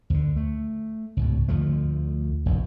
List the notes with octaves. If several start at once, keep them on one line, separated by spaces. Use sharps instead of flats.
D2 D3
A3
C#2 G#2 B2
D2 D3 F3 A3
F1 A#1 F#2